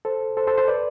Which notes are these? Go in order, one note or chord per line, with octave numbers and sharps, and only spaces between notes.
A4 C5
A4 C5
A4 C5
A4 C5
B4 D5